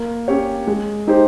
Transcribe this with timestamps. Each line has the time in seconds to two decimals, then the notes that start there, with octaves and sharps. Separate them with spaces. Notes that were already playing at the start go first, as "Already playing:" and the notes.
Already playing: A#3
0.28 C#4 G4 C#5
0.67 G#3
1.07 D#4 G4 C5